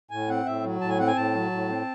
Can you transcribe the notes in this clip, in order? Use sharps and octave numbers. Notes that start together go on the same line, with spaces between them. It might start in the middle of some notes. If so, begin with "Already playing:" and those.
A2 G#5
C4 F#5
A2 E5
F#3
A2 A5
G#5
C4 F#5
G#5
A2 A5
F#3
A2
C4